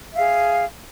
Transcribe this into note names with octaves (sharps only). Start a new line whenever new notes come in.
G#4 E5 F5